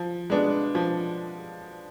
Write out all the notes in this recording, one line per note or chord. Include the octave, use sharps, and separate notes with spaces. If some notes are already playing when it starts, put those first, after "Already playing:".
Already playing: F3
G#3 B3 D4
F3